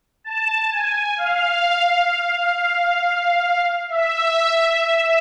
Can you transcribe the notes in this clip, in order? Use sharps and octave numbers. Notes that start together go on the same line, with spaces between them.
A5
G#5
F5
E5